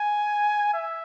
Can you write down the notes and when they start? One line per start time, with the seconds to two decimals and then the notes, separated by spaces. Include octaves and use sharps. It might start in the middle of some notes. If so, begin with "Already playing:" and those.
Already playing: G#5
0.73 E5